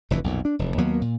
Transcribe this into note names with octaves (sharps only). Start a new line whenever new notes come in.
F1 D2 E3
B1 F2 A#2
D4
F1 E2
D#2 F#3 A#3 B3
A#2